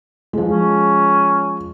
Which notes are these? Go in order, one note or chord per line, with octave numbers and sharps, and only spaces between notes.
F3 G#3
C#4